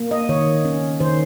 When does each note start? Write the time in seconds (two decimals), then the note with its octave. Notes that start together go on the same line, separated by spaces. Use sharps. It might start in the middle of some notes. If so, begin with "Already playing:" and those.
Already playing: A#3
0.11 D#5
0.29 D#3 C#5
0.65 C#4
1.00 D#3 C5